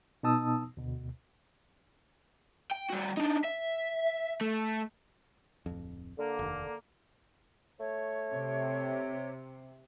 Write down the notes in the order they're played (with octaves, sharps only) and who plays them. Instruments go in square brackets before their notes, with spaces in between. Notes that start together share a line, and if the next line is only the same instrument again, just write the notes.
[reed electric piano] B2 B3 D#4 A5 D#6 E6
D2 B2
[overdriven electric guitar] G5
G3 F#4
D4 D#4
E5
A3
[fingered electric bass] D1 F2
[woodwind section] D3 A#3
[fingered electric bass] F1 D#2
[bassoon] A3 [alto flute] C#5
[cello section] C3